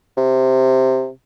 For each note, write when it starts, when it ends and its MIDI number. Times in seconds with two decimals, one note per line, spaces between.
0.17 1.09 48